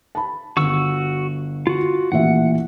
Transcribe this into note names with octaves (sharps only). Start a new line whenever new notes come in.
A5 B5
G1 F#4 C#6 E6
F4 F#4
A1 A#2 E5 F#5